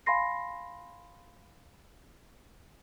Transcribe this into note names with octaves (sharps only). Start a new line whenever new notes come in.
F5 G#5 B5 C6 A#6 C7